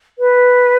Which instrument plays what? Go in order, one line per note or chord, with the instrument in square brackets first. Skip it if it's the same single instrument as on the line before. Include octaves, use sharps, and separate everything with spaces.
[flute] B4